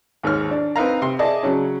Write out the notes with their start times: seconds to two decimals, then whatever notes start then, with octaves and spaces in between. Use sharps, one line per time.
0.23 D#2 G#2 C#5 F6
0.51 D4
0.76 C4 D#4 B4 F5 A#5
1.02 C3 C6
1.19 E4 G#4 D5 D#5 A5
1.43 C#3 F#3 C#4